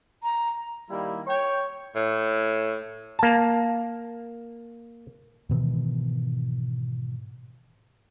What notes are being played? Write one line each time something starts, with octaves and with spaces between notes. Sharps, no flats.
A#5
D#3 G3 A#3 E4
C#5 G5
A2
A#3 A5
G#2 B2 D#3 E3